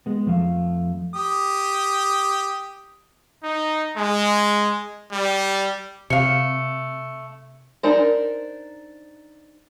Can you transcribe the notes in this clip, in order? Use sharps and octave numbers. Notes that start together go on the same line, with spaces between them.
G#3 B3
F2 F3 A3 F5
G4 D#6
D#4
G#3
G3
C3 A3 F5 C#7
D4 D#4 A#4 C5